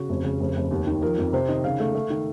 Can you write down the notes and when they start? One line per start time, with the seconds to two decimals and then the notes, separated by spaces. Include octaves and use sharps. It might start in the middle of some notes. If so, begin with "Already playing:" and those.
Already playing: C#3 F#4
0.09 F1
0.24 C#3
0.40 F1
0.56 F1
0.71 D#2
0.87 D#3
1.02 F3 A#4
1.18 F2
1.33 C3 C5
1.48 D#3 D#5
1.64 C#3 F5
1.80 A3
1.95 A3
2.10 D#3